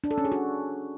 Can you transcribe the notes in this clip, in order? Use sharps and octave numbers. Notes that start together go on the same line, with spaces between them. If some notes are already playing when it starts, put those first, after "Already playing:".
D4
A4
C#4
G#4
F#4